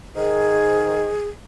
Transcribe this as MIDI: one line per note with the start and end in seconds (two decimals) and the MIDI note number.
0.16 1.09 44
0.16 1.09 51
0.16 1.28 68